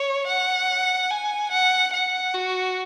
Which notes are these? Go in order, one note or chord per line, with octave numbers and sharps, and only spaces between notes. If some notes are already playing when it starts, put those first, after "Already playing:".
Already playing: C#5
F#5
G#5
F#5
F#5
F#4